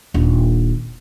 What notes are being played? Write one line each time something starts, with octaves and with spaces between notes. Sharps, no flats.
D#1 D4